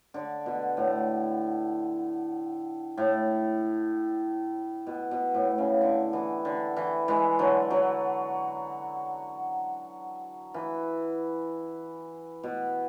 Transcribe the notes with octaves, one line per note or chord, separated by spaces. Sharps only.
D3
B2
A2
A2
B2
B2
A2
C#3
D3
E3
D3
E3
E3 G#3
D3 F#3
D3 F#3
E3
B2